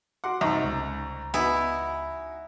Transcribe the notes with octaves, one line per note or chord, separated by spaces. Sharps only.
F#4 F#5 C6 D6
C2 D#4 D#5 E5 A#5 C#6
C#2
B3 D#4 E4 F#4 G#5